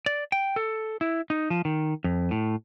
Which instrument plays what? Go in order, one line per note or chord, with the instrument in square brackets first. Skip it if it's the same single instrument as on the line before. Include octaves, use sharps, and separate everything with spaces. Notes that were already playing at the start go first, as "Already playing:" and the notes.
[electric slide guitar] D5
G5
A4
E4
D#4
F3
D#3
F2
A2